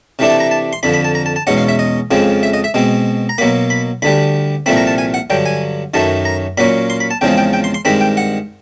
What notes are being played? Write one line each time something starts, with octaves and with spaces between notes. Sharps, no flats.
C3 E3 A3 D4
A5
A#5
A5
C6
F2 D3 F3 B5
B5
A5
A#5
A5
A5
E2 B2 G#3 C#4 F#5
F5
E5
D#5
F2 C#3 F3 G#3 C4
E5
D#5
E5
B2 G#3 C4
A#5
B2 F#3 A#3 B5
B5
D2 D3 G3 B5
C2 A#2 F3 A3 C4 B5
A#5
A5
G#5
F#5
G2 D3 F#3 G5
G#5
F#2 D#3 F#3 A3 A5
A#5
A#2 F#3 A#3 C#4 B5
C6
B5
A5
E2 C#3 F3 G#3 C4 G5
G5
G5
C6
C6
G2 D#3 G#3 C4 B5
G5
F#5